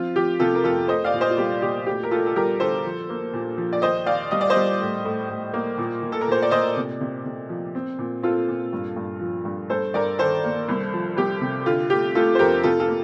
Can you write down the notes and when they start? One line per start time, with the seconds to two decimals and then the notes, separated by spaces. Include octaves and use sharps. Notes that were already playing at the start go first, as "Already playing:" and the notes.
Already playing: F3 C4 F4
0.16 F3 G4
0.39 C3 F4 A4
0.55 A#4
0.64 F2 F4 A4
0.88 A3 C5 D#5
1.04 D5 F5
1.13 A#2
1.21 C5 D#5
1.30 F4
1.37 C2 G4
1.62 A#2 G4
1.86 D2 G4
2.03 A#4
2.11 D2 F4 A4
2.26 A4
2.36 G3 G4 A#4
2.59 D3 A4 C5
2.85 F3
3.09 A#3
3.33 A#2
3.57 F3
3.73 D5
3.82 D#2 C5 D#5
4.06 D#2 D5 F5
4.31 G3 D#5
4.41 D5
4.50 C5 D#5
4.56 G3
4.81 A2
5.05 A2
5.30 A2
5.53 A#3
5.78 A#2
6.02 A#2
6.12 A4
6.21 A#4
6.28 A#2 C5
6.42 D5
6.51 A#2 C5 D#5
6.76 C3
7.00 C3
7.25 C3
7.49 F3
7.75 C4
7.99 A#2
8.23 C4 F4 A4
8.48 A#2
8.73 G2
8.96 G2
9.21 F3
9.45 G2
9.70 G2 A4 C5
9.94 G2 A#4 D5
10.19 D#3 A4 C5
10.44 A#3
10.69 C2
10.93 F3
11.17 C2 G4
11.41 C3
11.66 D3 F4
11.90 A3 G4
12.15 A3 F4 A4
12.35 C5
12.39 F2 G4 A#4
12.63 C3 F4 A4
12.80 F4 A4
12.88 A#3